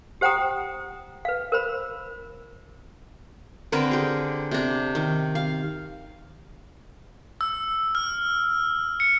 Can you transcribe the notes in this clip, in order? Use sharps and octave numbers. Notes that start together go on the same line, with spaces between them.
G4 C5 F#5 G5 A#5 D#6
B4 F5
A#4 C5 B5
D3 C4 A#4 B4
G4 G#4
C3 D4
D#3
F5
E6
F6
C#7